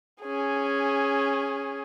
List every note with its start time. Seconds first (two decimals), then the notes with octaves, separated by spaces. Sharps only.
0.22 C#4 G#4